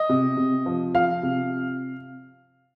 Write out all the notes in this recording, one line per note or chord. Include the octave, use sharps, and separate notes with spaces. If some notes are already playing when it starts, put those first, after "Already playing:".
Already playing: D#5
C3
C3
F3
F3 F5
C3